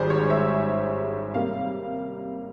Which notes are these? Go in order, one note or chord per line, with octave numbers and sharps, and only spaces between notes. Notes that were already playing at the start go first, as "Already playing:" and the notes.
Already playing: G#1 G#2 G3 G#4 C5
C#5
E5
C3 G3 A#3 F5